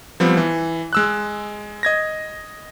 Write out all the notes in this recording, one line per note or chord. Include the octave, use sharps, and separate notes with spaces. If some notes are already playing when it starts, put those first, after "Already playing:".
F3 G3 B3 C4
E3
G#3 E6 F#6
D#5 G#6 A#6